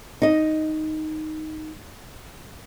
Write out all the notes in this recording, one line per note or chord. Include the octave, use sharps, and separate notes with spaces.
D#4 D#5